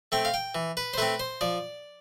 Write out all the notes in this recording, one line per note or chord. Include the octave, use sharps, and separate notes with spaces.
A3 C4 G5
F5
G5
E3
B4
C5
A3 C4 B4
C5
F3 D5